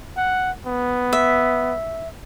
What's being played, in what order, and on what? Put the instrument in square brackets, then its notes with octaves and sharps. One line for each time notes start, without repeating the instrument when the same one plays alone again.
[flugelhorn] F#5
B3
[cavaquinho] E5